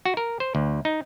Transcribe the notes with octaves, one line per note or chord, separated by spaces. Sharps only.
F#4
A#4
C5
D2
D#4